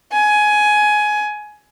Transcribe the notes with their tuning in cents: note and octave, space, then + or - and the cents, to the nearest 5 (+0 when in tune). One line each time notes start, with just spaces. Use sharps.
G#5 +15